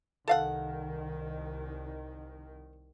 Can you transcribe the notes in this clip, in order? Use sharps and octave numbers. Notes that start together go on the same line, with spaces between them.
C2 D#3 A4 F5 F#5